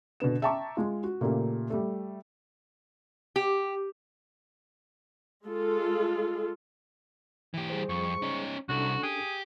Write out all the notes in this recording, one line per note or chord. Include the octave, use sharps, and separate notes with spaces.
B2 D3 B3 E7
E5 G5 A5 A#5 C#6 D6
G#3 F4
F#4
A#2 C#3 A3 A#3 G4
G3 A3
G4
G#3 F4 A4
E3 G4
G3 G#4 C5
F2 C#6
C#4 D#4
C2 C#4 D4 F#4 A4
G4 G#4